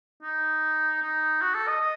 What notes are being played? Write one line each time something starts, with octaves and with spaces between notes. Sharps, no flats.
D#4
D#4
F#4
A4
D#5
D#5